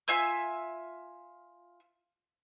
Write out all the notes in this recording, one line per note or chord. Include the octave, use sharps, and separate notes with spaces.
F4 E5 G#5 E6